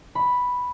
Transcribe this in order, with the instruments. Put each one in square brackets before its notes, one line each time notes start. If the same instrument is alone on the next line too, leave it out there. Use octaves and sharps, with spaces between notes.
[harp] B5